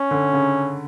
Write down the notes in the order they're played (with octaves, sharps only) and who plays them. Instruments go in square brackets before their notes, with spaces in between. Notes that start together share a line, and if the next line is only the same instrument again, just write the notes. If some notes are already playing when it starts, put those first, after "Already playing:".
Already playing: [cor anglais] C#4
[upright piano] D3
C#3